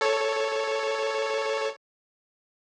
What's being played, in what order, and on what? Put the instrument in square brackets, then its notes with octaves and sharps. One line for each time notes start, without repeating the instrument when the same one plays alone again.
[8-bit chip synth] A4 C#5